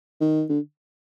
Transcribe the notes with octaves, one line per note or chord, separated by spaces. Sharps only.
D#3
D3